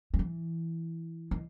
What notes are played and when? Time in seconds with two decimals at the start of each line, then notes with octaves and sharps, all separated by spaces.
0.14 F#3
0.19 E3
1.31 D#3